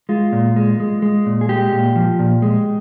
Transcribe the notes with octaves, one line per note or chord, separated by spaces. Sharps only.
G#3 F4
A#2
G#3
G#3
G#3
A#2
G#4
G#3 G4
A#2
F3
A#2
G#3